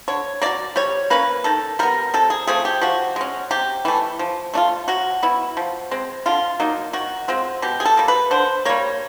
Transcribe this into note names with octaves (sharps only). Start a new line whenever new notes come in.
D3 C#5
F#3 A#3 D5
G3 C#5
A#3 C#4 B4
D#3 A4
G3 B3 A#4
C3 A4
G#4
F3 A3 C4 G#4
G4
F3 F#4
G#3 C#4
C3 G4
E3 A3
F3
A3 D4 F4
F#3 F#4
B3 E4
F3
G#3 C4
D3 F4
F#3 A#3 D#4
D#3 F#4
G#3 C4 F4
B2 G4
G#4
A4
G3 A#3
B4
D3 C5
G3 A#3 C#5